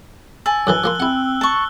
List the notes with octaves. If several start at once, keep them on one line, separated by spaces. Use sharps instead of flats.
G#5 A5 E6
F#2 D3 E3 E6 F#6 G7
F3 A#3 C6
C4 E4 F#5
A5 C#6